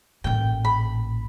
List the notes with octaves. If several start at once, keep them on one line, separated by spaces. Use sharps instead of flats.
A1 A#2 G5
B5